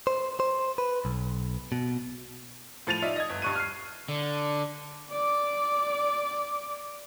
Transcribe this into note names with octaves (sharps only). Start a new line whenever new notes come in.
C5
C5
B4
B1
B2
A2 F3 A6 D#7 F7
D#4 F4 D5 E5
D#5 D#6 G#6
G1
G2 G3 C#6 F#6 D#7
F6 C7
D3
D5 D6